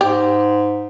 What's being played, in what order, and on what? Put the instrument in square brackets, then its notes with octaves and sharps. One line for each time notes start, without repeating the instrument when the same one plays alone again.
[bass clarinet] G#2 [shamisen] G4